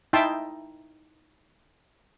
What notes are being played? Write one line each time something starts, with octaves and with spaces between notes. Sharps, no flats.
D#4 E4 E5 G5 A5 C6